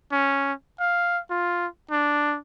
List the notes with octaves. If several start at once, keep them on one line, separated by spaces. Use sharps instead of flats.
C#4
F5
F4
D4